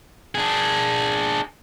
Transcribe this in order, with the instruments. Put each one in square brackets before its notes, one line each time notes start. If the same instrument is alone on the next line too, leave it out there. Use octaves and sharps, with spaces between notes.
[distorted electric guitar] D4 G#4